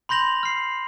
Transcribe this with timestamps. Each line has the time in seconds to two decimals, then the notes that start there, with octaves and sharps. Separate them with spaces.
0.09 B5 C6 G6 A#6 F7 F#7
0.43 F6 C7